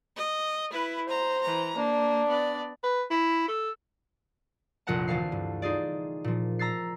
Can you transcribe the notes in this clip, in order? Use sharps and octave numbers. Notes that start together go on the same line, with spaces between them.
D#5
E4 B4
C5 A#5
E3 A#5
A#3 D4
B3 D5
B4
E4
A4
F1 A#1 F2 A#4 F#5 A5
D2 E3 A4 F5 C7
G2
D#4 F4 G#4 D5
A#2 F3
A#5 E6 A6 C7